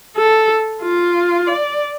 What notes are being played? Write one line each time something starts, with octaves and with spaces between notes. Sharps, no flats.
A4
F4
D5